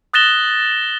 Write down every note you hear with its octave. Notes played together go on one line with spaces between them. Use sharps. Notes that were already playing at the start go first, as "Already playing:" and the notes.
D#6 F#6 A6 A#6 E7 G7